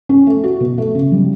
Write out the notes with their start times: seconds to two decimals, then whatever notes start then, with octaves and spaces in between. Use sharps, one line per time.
0.09 C#4
0.27 A3
0.44 F#4
0.60 B2
0.78 A3
0.95 C#3
1.12 G3